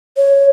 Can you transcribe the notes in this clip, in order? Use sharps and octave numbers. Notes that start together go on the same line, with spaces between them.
C#5